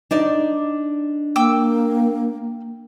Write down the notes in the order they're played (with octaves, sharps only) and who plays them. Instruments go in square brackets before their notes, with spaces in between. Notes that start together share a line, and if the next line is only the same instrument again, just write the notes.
[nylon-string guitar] D4 D#4 D5
[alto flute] A#3 [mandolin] G5 D6 E6